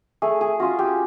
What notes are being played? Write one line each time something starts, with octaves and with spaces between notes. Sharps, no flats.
A3 G#4
G#4
C#4 F4 F#4
G4